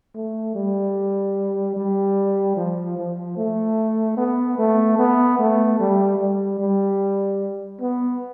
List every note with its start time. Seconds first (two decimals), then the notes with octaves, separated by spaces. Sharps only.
0.15 A3
0.55 G3
1.76 G3
2.57 F3
2.97 F3
3.37 A3
4.17 B3
4.58 A3
4.98 B3
5.39 A3
5.80 G3
6.19 G3
6.60 G3
7.81 B3